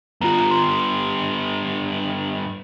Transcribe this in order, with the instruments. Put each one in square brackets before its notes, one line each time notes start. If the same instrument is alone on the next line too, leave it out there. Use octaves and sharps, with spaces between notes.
[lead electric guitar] G2 B3 [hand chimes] F4 A#5
[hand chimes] C6